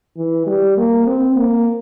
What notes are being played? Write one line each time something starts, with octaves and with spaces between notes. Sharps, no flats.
E3
G3
A#3
C4
A#3